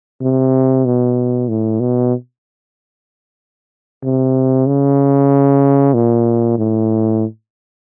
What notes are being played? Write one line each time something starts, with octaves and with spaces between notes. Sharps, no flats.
C3
B2
A2
B2
C3
C#3
A#2
A2